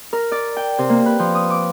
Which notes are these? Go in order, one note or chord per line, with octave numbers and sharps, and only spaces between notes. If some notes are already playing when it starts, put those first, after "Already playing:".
A#4
D5
G5
C3
A#3
B4
F3
D#6
D6